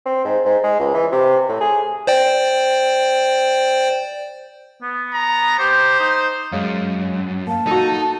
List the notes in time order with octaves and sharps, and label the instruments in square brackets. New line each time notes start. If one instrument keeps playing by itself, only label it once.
[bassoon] C4
G#2
G#2
G#3
C#2
E3
C3
A2
G#4
[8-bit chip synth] C5 D5 G5
[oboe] B3
[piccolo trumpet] A#5
[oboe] G4 [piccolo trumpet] C5
[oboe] D#4
[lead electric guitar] F#2 [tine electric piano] G#3 C#5 F5
[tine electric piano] A#3 F5 [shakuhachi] A5
[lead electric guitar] D#4 [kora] F#4 A4